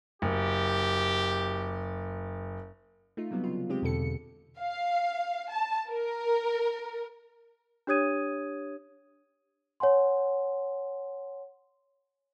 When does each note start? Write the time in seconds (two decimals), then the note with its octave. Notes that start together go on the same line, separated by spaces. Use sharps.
0.22 F#1 G4
3.17 A3 D#4 F4
3.31 C3 F#3 G3 B3
3.44 C#3 F4
3.70 G#3 C4 G4
3.82 E2 B2 D3 A4 C#7
4.59 F5
5.51 A5
5.89 A#4
7.87 D4 G4 C#5 D#6 G#6 D#7
9.80 C#5 F#5 G#5 C6